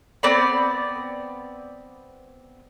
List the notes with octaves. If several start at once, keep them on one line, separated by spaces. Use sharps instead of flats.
B3 C4 D5 B5